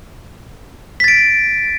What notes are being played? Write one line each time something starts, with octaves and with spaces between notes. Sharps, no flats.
A6 B6 D7